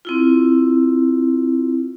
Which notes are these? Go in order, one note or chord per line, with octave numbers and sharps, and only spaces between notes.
C4 E4 F4